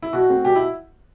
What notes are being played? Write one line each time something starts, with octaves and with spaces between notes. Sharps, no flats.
E4
B2 F#4
A3 C4
B2 G4
E4